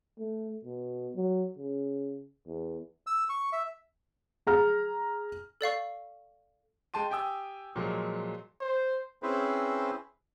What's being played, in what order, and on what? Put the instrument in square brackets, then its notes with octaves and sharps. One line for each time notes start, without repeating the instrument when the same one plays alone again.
[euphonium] A3
B2
F#3
C#3
E2
[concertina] E6
C#6
E5
[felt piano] G#4 A#5 F6
[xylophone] A4 D5 F5 C#6
[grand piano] G#3 G5 A5 C6 D#7
G4 G5 G#5 D#6 E6
A#2 F3 F#3 G#3
[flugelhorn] C5
[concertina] C4 C#4 E4 G#4 B4 C5